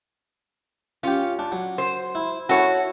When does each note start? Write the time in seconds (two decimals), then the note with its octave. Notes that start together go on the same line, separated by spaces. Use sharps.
1.03 C#4 F4 G4
1.39 D4
1.52 F#3
1.78 C5
2.15 E4
2.49 E4 F#4 A4 C#5